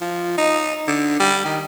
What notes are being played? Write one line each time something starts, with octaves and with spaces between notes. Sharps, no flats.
F3
D#4
D3
G3
D#3